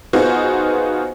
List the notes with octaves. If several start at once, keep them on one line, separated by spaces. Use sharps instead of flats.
B3 D#4 F4 F#4 G#4 C5